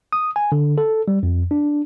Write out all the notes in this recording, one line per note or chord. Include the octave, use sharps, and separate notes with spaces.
D#6
G#5
D3
A4
G3
F2
D4